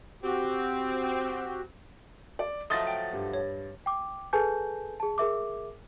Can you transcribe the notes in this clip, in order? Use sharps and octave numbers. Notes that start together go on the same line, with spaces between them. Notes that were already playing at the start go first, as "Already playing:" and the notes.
C4 F#4 G4
D5
F3 F#3 A3 D#5 C6 D#6 A6 A#6
G5 D7
G2
C#5
G5 D6
G#4 A4 B4 G#5 A5 G6
G#4 A5
G#4 A#4 E5 D6